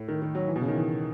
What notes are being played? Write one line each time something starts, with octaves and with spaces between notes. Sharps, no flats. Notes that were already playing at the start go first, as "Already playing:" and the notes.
Already playing: A2
D#3
D#3
F#3
E3
B2
C#3
D#3
E3